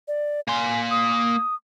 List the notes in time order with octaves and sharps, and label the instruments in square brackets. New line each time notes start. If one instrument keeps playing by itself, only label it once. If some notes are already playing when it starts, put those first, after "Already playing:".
[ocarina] D5
[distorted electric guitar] A#3 C6 [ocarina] G#5
[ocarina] D#6